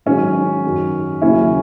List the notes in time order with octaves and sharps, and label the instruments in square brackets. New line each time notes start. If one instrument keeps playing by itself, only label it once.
[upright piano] G#2 D#3 F#3 C#4
F#2 D#3 F#3
D#2 C#3 F#3 C#4 E4